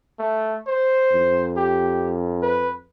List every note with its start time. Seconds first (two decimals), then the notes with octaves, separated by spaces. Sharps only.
0.19 A3
0.67 C5
1.13 F2
1.57 G4
2.42 B4